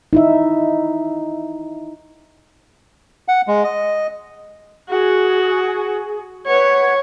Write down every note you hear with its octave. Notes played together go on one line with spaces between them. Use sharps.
D#4 E4 E5
F#5
G#3
D#5
F#4 G#4
B4 C#5 F#5